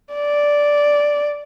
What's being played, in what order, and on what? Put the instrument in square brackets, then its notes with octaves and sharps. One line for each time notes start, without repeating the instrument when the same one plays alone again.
[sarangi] D5